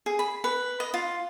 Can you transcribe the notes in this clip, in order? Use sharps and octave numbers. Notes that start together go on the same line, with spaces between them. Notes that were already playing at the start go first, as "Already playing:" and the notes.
G#4
B5
B4
D#5
F4